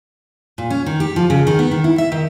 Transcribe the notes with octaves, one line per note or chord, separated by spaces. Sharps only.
A#2
C#4
D#3
G4
F3
C#3
D#3
B3
D#3
E4
E5
D#3